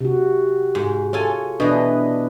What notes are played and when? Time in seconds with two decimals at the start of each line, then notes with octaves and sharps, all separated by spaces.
0.01 C3 F#4
0.75 G#2
1.13 F4 A4 C#5 G#5
1.60 B2 E3 D4 B4 D#5